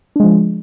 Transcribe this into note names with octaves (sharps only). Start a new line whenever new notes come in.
F3 G#3 D4